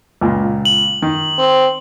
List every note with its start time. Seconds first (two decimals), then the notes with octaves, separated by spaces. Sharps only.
0.21 C#2 A#2
0.65 F#7
1.02 D#3
1.38 C4